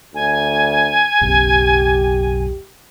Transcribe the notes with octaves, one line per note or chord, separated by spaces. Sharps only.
D2 G#5
F#1 B1 G4